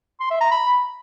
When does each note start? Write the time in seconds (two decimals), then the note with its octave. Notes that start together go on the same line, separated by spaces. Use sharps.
0.20 C6
0.31 E5
0.41 A#5
0.51 B5